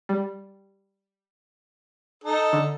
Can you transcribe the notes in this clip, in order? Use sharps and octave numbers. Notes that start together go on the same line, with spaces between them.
G3
D#4 A4
D3